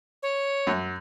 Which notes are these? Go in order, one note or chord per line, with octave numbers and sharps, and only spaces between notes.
C#5
F#2